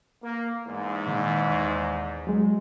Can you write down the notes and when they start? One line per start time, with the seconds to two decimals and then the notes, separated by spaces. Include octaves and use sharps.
0.22 A#3
0.66 E2 G#2
1.06 A#2 D#3
1.50 D#2
2.27 F#3 G#3